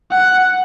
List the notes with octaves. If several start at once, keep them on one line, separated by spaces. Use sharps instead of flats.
F#5